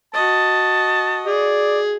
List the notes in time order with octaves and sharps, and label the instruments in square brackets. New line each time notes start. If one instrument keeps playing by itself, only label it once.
[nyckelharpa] F#4 D#5 [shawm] A5
[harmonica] G#4 [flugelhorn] D5